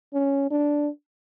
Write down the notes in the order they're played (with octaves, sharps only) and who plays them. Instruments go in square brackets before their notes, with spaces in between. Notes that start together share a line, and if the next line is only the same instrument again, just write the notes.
[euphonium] C#4
D4